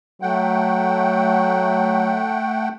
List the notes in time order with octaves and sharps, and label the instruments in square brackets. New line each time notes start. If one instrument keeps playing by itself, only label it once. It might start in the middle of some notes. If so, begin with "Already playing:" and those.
[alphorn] F#3 [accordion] A3 F#5 G5